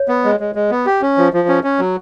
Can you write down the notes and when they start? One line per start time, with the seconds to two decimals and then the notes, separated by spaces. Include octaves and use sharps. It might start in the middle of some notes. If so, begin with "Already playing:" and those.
Already playing: C#5
0.08 B3
0.24 G#3
0.40 G#3
0.55 G#3
0.71 B3
0.86 G4
1.02 C#4
1.17 F3
1.33 F3
1.48 C#4
1.64 C#4
1.79 F#3